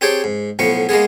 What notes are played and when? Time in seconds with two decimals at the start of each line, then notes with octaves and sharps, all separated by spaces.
0.01 C4 G4 G#4 C#5 G5 A5
0.24 G#2
0.59 B1 A2 F3 B3 C#6
0.89 G#3 A#3 B3 G#4